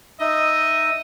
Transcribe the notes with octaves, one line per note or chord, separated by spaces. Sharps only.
D#4 D#5 E5